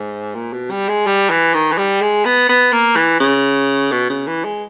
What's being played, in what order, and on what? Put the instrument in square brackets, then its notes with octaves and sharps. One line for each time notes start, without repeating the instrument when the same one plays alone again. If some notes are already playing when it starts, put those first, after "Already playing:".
Already playing: [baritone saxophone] G#2
A#2
B2
G3
G#3
G3
E3
D#3
E3
G3
G#3
B3
B3
A#3
E3
C#3
B2
C#3
E3
G#3